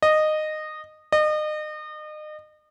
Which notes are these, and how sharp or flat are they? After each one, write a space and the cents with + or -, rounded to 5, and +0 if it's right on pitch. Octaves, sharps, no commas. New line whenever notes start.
D#5 -15
D#5 -35